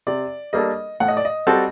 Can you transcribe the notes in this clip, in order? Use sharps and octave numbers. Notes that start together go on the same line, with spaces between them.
C3 D5
G3 A#3 D4 A4 D#5
A2 F#5
D#5
D5
D#5
G3 C4 F#4 A4